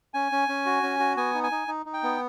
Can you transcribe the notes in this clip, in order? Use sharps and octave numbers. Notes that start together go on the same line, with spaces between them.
C#4 G#5
C#4
C#4
F#4
C#4
F#4
B3 G#5
D#4
G#5
D#4
D#4
D#4
G5
B3